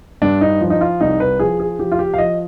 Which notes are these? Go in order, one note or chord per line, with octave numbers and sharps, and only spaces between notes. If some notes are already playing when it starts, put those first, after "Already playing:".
G2 D4
D#4
F3
D#4
F4
C2 D#4
B4
F3 G#4
G#4
F3 G4
F4
G4
F5
F3 D#5